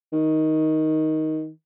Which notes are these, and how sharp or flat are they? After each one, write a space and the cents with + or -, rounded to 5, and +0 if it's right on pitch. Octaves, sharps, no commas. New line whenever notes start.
D#3 +10